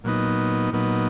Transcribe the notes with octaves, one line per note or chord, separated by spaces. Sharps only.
A#2 F#3 B3 D#4
A#2 F#3 B3 D#4